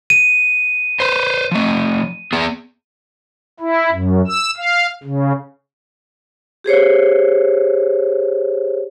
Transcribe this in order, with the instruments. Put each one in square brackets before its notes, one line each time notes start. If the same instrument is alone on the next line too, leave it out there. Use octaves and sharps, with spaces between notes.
[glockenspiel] D#7
[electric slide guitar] B4 C5
F3 A3
B3 G#4
[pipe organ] E4
F#2
E6
F5
C#3
[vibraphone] G4 G#4 C5 C#5